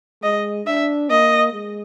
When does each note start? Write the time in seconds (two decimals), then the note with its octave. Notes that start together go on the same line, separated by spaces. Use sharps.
0.22 G#3 D#5
0.66 D4 E5
1.10 A#3 D#5
1.53 G#3